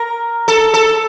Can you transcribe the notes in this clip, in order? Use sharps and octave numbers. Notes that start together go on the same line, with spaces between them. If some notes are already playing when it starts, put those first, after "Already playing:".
Already playing: A#4
A4
A4